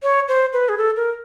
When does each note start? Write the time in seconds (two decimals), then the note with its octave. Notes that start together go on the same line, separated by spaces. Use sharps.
0.03 C#5
0.28 C5
0.53 B4
0.69 G#4
0.78 A4
0.97 A#4